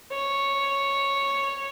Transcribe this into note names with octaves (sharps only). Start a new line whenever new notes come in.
C#5